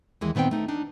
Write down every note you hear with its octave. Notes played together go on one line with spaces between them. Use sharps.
D#2 E3 G#3
A#2 D#3 B3 C4 G5
A3 D#4
D4 D#4